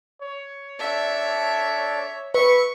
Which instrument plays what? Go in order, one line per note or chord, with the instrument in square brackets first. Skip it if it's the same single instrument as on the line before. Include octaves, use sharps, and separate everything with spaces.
[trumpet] C#5
[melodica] D4 A4 D5 [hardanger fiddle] E5
[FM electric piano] B4 [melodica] E5 B5 [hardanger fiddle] C#6